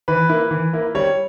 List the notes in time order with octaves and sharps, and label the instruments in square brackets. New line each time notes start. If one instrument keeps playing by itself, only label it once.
[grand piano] E3 B4
A#3 E4
E3
A#3 E4
G3 C#5